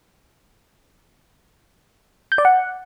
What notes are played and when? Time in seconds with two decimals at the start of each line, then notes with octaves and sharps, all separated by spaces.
2.32 G6
2.38 D5
2.45 F#5